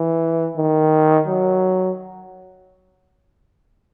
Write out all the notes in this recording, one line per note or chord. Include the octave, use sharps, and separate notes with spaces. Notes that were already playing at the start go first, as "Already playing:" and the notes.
Already playing: E3
D#3
F#3